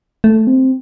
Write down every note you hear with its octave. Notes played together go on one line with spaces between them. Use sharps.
A3
C4